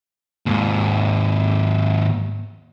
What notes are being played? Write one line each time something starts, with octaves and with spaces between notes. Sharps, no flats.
D#2 G#2